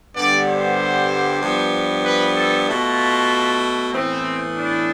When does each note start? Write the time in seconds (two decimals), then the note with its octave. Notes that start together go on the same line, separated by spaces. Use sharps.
0.16 G2 D3 G3 B3 D5
0.47 C5
1.42 G2 F3 B3
2.05 B4
2.36 A4
2.67 B2 A3 F4
3.93 A2 E3 B3 C4
4.56 D4